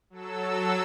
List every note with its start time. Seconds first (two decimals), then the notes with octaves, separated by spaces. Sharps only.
0.10 F#3 A4 E6